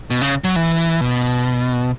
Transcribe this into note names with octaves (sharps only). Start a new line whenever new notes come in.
B2
C#3
F#3
E3
B2